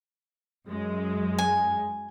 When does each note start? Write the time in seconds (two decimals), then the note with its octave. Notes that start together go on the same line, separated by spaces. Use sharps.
0.67 F#2 G#3
1.39 G#5